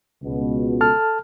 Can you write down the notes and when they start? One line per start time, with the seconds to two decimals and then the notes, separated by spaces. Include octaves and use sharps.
0.23 C#2 B2
0.81 A4 A5 F6